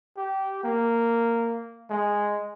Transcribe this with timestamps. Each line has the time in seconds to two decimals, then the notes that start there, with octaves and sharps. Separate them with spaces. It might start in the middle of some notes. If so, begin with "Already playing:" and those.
0.17 G4
0.64 A#3
1.90 G#3